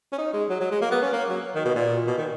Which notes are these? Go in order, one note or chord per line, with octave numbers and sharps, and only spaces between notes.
C#4
D#4
G#3
F#3
F#3
G#3
A#3
B3
C#4
A#3
F#3
D#3
B2
A#2
B2
D#3